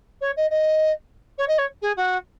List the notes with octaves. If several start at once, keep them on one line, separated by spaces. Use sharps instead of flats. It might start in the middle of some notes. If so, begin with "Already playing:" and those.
C#5
D#5
D#5
C#5
D#5
C#5
G#4
F#4